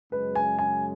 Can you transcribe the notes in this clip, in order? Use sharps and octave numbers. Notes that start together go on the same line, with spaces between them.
F#2 C#3 G#3 B4
G#5
G#5